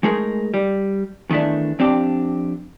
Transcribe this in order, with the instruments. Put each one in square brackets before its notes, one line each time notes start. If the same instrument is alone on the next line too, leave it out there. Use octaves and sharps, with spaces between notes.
[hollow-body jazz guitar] G#3 A3 D#4 G#4 A#4
G3
E2 D#3 E3 A3 D4
F2 C4 D4 G4